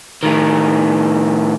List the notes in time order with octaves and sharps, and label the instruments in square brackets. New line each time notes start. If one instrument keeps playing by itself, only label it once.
[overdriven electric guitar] A2 D#3